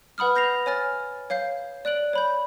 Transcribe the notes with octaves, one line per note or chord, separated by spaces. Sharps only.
B4 F#5 B5 D#6 F6
G6 A#6 C7 F7
C#5 G#5 F6 A6
C#5 F5 G6 C7
D5 F#6 D7 F#7
C#5 B5 G6